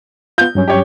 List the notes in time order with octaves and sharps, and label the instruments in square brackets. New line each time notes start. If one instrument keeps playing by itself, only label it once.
[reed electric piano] B3 F4 [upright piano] G6
[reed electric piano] G2 F#3 C#4
[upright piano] G4 C#5